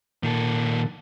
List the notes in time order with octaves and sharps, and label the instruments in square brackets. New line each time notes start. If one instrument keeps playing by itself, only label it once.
[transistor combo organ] A#2 [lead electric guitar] D#3 A4